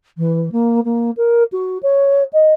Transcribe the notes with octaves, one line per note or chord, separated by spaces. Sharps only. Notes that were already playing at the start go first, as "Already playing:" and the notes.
E3
A#3
A#3
A#4
F#4
C#5
D#5